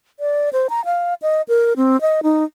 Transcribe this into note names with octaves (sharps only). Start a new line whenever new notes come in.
D5
C5
A#5
F5
D#5
A#4
C4
D#5
D#4